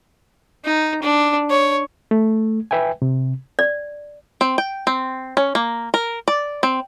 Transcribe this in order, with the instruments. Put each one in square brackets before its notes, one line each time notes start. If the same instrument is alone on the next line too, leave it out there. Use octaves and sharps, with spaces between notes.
[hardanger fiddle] D#4
D4
C#5
[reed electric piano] A3
B4 E5 G5 G#5
C3
[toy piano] D5
[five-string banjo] C4
G5
C4
C#4
A#3
A#4
D5
C4